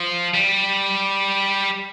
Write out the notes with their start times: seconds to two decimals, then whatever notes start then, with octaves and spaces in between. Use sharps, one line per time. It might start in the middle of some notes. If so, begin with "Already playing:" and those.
Already playing: F3
0.35 G3